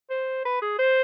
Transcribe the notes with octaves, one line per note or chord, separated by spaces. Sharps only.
C5
B4
G#4
C5